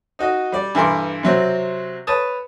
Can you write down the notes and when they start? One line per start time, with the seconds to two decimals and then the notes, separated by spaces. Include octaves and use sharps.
0.19 D#4 F#4 D#5
0.52 G3 D5
0.75 G2 E3 A4 A#4 C6 D6
1.23 C3 F#3 C4
2.07 B4 C#5 A5 D#6